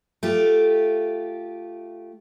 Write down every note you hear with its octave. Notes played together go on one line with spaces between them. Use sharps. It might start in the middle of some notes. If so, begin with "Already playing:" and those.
A3 F4 G4